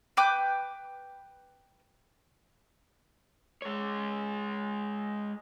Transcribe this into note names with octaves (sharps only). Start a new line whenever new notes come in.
B4 G5 D6 G6
G#3 C#5